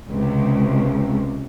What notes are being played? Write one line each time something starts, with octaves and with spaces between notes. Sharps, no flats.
C#2 C3